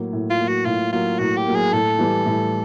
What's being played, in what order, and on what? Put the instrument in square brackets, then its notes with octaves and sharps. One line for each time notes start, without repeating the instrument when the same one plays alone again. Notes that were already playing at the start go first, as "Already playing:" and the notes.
Already playing: [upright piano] A2 F#3 A#3
A2
[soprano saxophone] F4
[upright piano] F#3 A#3
[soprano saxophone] F#4
[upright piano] A2 [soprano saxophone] F4
[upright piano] F#3 A#3 [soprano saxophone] F4
[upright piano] A2 [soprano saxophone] F#4
[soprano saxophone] G4
[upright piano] F#3 A#3
[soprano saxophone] G#4
[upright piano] A2 [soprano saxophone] A4
[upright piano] E3 G3
A2